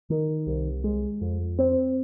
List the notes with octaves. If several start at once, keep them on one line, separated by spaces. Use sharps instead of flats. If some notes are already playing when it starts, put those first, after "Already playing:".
D#3
C2
G#3
F2
C4